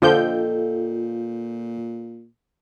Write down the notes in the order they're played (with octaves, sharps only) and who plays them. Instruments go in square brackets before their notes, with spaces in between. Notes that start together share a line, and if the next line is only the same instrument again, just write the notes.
[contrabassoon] A#2 [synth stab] D3 F3 G6 [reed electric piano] F4 [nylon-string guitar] A4 D#5 G5